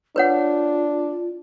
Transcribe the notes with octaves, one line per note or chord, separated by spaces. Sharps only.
D4 F4 B4 C#5 F#5